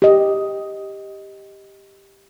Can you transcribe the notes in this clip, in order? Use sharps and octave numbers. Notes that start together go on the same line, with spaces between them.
G4 D#5